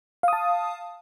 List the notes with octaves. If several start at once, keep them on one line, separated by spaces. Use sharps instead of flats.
F5 A5 D#6